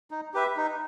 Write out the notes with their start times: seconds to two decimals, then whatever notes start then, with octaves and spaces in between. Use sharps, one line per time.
0.11 D#4
0.34 G4 B4 E5
0.57 D#4